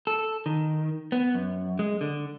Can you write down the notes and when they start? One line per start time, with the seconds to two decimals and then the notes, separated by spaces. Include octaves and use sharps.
0.07 A4
0.46 D#3
1.12 B3
1.34 F#2
1.79 G#3
2.01 D3